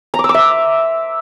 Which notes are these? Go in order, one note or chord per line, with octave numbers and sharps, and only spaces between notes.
A#5
D6
E6
D6
E5